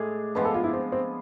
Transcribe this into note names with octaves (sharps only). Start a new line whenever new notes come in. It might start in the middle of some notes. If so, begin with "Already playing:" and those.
Already playing: A2 G#3 D4 G#4
F3 G#3 B3 D4 B4
A4
F4
E4
C4
C4